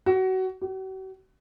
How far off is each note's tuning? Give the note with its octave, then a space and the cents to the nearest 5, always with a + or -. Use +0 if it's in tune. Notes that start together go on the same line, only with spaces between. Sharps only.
F#4 +25
F#4 +45